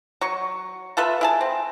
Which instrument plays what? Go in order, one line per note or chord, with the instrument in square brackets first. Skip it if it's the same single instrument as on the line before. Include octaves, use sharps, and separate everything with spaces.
[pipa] F#3 C#6
F4 A4 B4 E5
E4 G#4 A5
C4